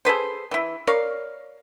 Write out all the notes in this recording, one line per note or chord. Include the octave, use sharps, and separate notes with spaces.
G#4 A4 B4 C5
E3 E4
A#4 C#5 D5 F5